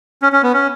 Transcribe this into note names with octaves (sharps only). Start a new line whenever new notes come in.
C#4
C#4
B3
C#4